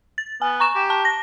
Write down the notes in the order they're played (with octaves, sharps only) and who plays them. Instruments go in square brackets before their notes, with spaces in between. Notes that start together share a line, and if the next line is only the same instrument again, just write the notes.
[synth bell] A6
[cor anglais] B3 [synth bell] G#5
[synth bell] A#5 C#6 E7
[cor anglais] G4
[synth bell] A5
A#6